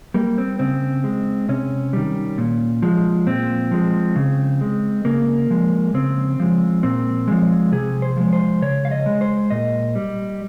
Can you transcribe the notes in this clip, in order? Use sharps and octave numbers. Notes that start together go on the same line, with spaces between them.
G3 A#3
C4
C#3 C4
G#3
C3 C#4
D#3 G3
A#2
F3 G#3
A#2 C4
F3 G#3
C#3
G#3
C#3 A#3
F3 G#3
C#3 C4
F3 G#3
A#2 C4
F3 G#3
C3 G#4
C5
F3 G#3
C5
C#3 C#5
F5
D#5
G#3
C5
A#2 D#5
G3